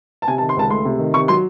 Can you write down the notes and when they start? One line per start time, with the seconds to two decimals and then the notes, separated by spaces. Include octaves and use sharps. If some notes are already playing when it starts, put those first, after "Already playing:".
0.22 A5
0.27 C3 G#5
0.38 A5
0.42 D#3
0.49 C6
0.57 C#2 A5
0.70 A3 C6
0.85 C3
0.99 D#3
1.14 C3 C#6
1.28 F#3 C6